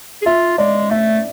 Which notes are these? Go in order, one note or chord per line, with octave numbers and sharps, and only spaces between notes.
G#4
F4 E5
G#3 D5
A3 E5